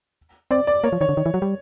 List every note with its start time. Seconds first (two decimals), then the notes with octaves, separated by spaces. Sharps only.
0.51 C4 D5
0.67 D5
0.84 A#3 C#5
0.92 F3
1.01 D#3 C#5
1.09 D3
1.17 D#3
1.26 E3
1.34 F#3
1.42 G3